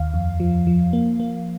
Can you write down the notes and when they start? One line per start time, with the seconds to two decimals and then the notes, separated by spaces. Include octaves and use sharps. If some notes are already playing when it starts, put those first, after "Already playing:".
Already playing: D#2 F5
0.14 F2
0.40 F3
0.67 F3
0.93 A#3
1.20 A#3